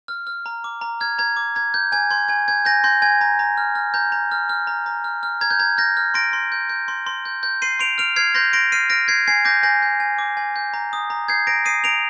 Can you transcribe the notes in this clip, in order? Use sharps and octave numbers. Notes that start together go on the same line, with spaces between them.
F6
F6
A#5
D6
A#5
F6 G#6
A#5 G#6
D6
A#5 G#6
G6
G#5 G#6
C6 G#6
G#5 G#6
G6 G#6
G#5 G6 A#6
C6 G6 A#6
G#5 G#6
A#5
A#5
F6
F6
A#5 G6
A#5
F6
F6
A#5
A#5
F6
F6
A#5 G#6
G6
A#5 G#6
F6 G6 A#6
F6
C6 A#6 D7
C6
G6
G6
C6
C6
G6
G6
C6 C7 D#7
C6 D7 F7
F6 D7 F7
F6 G#6 C7
C6 G6 A#6
C6 A#6 D7
F6 C7 D#7
F6 A#6 D7
G6 G#6 C7
G#5 G#6 C7
D6 G6 A#6
G#5 G6 A#6
G6
G#5
D6
G#5
G6
A#5
D#6
A#5
G6 G#6 C7
A#5 A#6 D7
D#6 C7 D#7
A#5 D7 F7